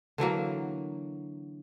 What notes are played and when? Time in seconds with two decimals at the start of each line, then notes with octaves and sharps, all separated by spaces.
0.18 D3 E3 F#3 A#3